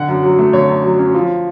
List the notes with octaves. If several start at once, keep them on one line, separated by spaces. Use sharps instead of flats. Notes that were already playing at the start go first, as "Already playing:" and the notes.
Already playing: D3 F#5
F#2
F#3
A3
D3 C#5
F#2
F#3
C#4
F3